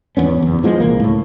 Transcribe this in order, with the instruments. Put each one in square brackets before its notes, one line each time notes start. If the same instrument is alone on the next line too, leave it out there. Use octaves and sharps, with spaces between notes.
[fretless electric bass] G#1 E2 B3 C#4
F#1 E2
E3 F3 G#3 B3
D#1 C2 A#3
C#2 A2